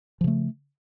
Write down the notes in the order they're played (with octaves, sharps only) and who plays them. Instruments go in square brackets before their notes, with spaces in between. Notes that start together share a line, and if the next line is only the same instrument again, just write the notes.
[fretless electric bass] F3
C#3
A3